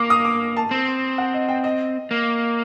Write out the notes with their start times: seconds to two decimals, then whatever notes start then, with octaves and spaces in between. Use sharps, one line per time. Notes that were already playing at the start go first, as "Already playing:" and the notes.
Already playing: A#3 D6
0.10 D#6
0.25 D6
0.57 A5
0.71 C4
1.18 F#5
1.34 D#5
1.48 G5
1.64 D#5
2.11 A#3